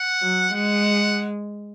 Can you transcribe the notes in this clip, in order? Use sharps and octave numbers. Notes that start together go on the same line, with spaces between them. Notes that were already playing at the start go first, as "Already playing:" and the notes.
Already playing: F#5
F#3
G#3 F#5